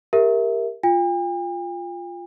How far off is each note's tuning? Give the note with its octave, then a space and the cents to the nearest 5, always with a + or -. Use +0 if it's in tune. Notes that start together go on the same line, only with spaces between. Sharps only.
G4 +20 A#4 +0 E5 +0
F4 +0 G5 +45